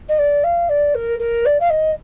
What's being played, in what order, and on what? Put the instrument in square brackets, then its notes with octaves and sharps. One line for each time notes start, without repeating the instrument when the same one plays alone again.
[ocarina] D#5
D5
F5
D5
A#4
A#4
D5
F5
D#5